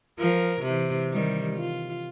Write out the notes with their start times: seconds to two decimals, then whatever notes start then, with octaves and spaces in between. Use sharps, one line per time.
0.19 F3 A#4
0.62 C3 E3
1.10 D#3 G3
1.56 F4